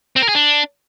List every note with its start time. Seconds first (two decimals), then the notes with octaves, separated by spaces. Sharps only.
0.16 C4
0.22 A#4
0.29 G#4
0.35 D4